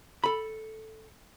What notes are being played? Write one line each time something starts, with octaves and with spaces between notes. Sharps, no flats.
A4 B5